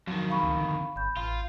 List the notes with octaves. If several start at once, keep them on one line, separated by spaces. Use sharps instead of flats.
F2 D#3 F#3
F5 B5 C#6
C#2
D3
G1 B5 G6
A1 F4